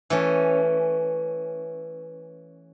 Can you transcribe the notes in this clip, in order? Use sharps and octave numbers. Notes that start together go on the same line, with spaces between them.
E3 A3 C#4